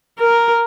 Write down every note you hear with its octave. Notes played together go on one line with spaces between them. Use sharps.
A#4